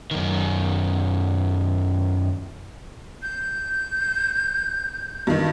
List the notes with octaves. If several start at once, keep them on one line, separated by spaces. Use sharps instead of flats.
F#2 D#3
G6
G2 D#3